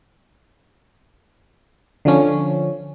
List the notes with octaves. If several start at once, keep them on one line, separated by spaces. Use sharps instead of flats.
D3 F3 C#4